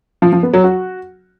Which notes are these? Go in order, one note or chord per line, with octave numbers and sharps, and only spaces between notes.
F3
F3
B3
F#3
F#4